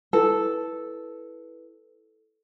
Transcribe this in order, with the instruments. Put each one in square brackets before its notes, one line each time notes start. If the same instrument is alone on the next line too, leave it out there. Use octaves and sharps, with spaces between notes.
[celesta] E4 B4 [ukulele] A4